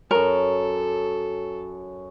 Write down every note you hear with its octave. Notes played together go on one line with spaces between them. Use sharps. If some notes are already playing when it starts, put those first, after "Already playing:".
F#2 A4 A#4 C#5